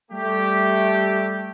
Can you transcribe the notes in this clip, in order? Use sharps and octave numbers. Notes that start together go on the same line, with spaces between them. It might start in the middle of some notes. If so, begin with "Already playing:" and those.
G3 A3 G4